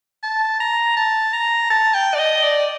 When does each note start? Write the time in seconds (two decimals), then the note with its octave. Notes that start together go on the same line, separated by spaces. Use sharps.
0.23 A5
0.60 A#5
0.97 A5
1.33 A#5
1.70 A5
1.94 G5
2.15 D5
2.19 D#5
2.43 D5